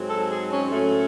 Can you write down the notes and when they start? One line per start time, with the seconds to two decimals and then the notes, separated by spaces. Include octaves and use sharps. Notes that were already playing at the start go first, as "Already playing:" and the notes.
Already playing: G#2 F#3 C4
0.09 A4
0.29 G#4
0.50 C#4
0.70 A2 F#3 A3 C#4